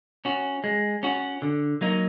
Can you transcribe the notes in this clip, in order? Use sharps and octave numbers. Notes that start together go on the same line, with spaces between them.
C#4 F#4
G#3
C#4 F#4
D3
F#3 A#3 D#4